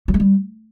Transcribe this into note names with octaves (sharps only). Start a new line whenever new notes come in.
F#3
G#3
G3